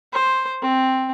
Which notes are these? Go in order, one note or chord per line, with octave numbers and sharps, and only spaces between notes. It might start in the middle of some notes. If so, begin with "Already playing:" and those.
C5
C4